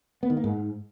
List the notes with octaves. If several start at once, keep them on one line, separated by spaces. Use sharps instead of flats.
B3
D#3
A#3
G#2